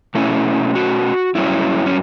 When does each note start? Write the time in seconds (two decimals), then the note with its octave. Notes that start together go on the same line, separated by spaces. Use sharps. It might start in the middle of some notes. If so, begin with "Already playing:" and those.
0.15 B2 A3 C#4 E4
0.75 F#4
1.35 G2 F#3 C#4 E4
1.86 C#4